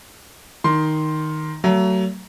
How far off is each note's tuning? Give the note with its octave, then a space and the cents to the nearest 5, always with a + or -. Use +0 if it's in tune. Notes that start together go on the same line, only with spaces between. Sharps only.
D#3 +0 C6 +5
F#3 +30 A3 +40